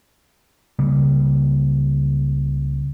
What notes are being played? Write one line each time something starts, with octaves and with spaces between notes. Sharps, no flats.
C#2 C#3 G3 A#3